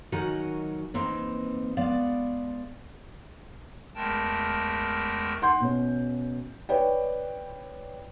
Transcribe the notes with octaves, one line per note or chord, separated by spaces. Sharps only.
D#3 F#3 D#4 F#4 A#4 G#5
E3 A#3 C4 D#4
G#3 B3 D5 F5
E2 G#3 A3 A#4 G5 A5
F#5 C6 G6
B2 C#4
B4 C#5 D5 G5